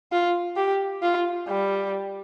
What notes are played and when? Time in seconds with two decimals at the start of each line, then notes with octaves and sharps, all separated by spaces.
0.12 F4
0.57 G4
1.02 F4
1.49 G3